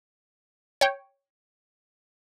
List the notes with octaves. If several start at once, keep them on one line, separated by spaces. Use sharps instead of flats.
C#5 G5